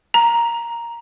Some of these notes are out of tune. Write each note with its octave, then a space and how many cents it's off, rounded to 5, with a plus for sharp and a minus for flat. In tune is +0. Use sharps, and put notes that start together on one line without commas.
A#5 +5